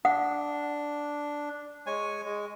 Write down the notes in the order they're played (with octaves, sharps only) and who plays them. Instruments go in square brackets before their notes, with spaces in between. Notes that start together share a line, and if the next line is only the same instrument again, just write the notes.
[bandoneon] D4 [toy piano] F#5
[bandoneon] G#3 C#5 G#5
G#3